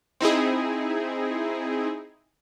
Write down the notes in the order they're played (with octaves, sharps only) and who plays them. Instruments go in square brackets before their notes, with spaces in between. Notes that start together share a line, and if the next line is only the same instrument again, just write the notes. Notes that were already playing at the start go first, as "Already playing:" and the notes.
[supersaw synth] C4 D#4 E4 G#4